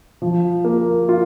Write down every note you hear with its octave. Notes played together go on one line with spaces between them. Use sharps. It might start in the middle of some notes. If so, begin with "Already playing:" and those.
F3
A#3
F4